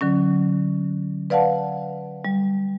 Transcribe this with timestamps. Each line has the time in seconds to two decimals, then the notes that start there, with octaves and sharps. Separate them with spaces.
0.01 D3 F#3 C#4
1.30 B4 D5 F5 F#5 A5
2.25 G3